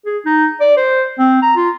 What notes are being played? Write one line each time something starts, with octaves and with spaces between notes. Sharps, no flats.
G#4
D#4
D5
C5
C4
A#5
F4